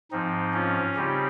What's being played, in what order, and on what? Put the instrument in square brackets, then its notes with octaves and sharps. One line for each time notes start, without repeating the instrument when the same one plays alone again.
[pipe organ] G#2 F3 C4 D#4
C#4 F4
C#3 G3 C4 D#4 G4